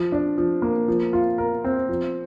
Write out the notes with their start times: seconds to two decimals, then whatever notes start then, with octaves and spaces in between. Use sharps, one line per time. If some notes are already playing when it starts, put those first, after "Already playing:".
Already playing: F3
0.12 D4
0.38 F3
0.62 A#3
0.88 F3
1.13 F4
1.38 A#4
1.64 C4
1.89 F3